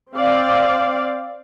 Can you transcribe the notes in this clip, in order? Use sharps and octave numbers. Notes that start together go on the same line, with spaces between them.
C4 D5 F5